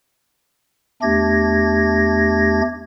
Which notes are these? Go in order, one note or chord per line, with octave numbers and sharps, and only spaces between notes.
E2 A3 D4 G4 G#6 A#6